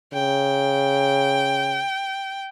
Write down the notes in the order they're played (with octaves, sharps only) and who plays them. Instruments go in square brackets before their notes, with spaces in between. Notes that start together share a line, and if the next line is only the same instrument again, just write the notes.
[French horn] C#3 [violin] G5